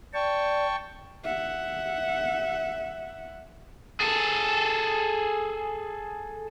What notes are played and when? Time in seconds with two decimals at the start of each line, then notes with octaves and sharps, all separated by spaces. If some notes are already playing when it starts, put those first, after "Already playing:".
0.14 D5 G5 A5 C#6
1.24 E5 F#5
4.01 G#4 A4